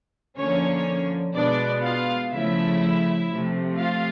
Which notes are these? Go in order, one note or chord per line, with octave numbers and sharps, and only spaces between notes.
D3 F3 A#3 C#4 C#5
B2 G#3 B3 D4 D5
F4 F5
C#3 F3 A3 E4 E5
C3 F3 A3
F4 F5